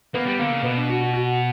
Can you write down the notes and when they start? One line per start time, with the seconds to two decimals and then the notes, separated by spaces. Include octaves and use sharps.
0.14 A#3 B3
0.27 G3
0.39 D3 A#3
0.52 C#3
0.64 B2 B3
0.76 D4
0.89 F#4
1.01 F#4
1.13 F#4